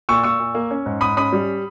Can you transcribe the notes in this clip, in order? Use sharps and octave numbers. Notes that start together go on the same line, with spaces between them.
A#2 C#6 E6
A#2 C#6 E6
A#2
A#3
C#4
G#2
G#2 B5 D#6
C#4 B5 D#6
G3